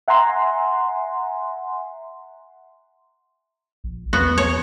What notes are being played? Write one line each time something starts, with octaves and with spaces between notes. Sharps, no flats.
E5 F#5 G#5 A#5 C6
A#1
E2 B3 F#4
C#5